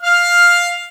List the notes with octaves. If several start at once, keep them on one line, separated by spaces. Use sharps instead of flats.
F5 F6